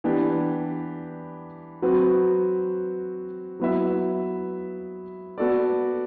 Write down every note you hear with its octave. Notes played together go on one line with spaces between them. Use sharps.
E3 B3 D4 G4
F#3 C4 F#4 B4
F#3 B3 E4 B4 E5
B3 F#4 A4 D5